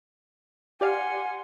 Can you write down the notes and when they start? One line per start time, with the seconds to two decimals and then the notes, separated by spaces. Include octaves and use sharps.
0.81 G4 D5 F5 F#5 G#5 C6